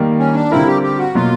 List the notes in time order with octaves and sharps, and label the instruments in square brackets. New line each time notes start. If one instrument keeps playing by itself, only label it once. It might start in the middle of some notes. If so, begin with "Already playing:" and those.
Already playing: [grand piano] D#3 G3 A#3
[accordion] C#4
D4
[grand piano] D3 G3 C4 F4 A#4 [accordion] E4
[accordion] G4
G4
F#4
[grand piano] B2 F#3 A#3 [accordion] F4